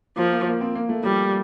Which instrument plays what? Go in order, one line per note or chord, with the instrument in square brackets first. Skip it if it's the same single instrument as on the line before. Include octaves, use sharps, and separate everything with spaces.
[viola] F3 [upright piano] A#3
[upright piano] A#3
A#3
C4
A#3
A3
[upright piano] F3 [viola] G3